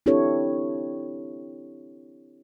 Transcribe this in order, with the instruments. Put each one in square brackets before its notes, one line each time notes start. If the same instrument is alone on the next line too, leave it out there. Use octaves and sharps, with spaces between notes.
[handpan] C4 D4 E4 G4 A4 C#5